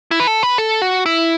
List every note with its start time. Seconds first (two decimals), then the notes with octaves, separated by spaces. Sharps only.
0.11 E4
0.20 B4
0.27 A4
0.43 B4
0.58 A4
0.82 F#4
1.06 E4